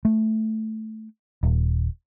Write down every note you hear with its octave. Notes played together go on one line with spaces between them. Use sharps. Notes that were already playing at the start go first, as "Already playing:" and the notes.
A3
D#1